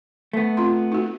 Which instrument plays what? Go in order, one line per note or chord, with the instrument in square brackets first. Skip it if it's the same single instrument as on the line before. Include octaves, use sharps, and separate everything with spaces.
[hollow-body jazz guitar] A3 B3
[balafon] C4 F4 C6
D#4 F#4